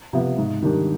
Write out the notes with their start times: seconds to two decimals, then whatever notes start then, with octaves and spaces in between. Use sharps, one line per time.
0.13 C3 F3 B3 F4
0.38 G#2
0.62 D#3 G3 D4 G4